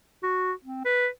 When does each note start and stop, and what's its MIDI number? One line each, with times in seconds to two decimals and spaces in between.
0.23 0.53 66
0.65 0.84 60
0.85 1.08 71